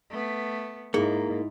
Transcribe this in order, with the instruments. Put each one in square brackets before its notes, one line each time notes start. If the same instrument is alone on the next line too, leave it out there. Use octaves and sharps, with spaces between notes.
[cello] A3 B3
[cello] G#2 [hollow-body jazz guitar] A#3 [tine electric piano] D#4 E4 [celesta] G#4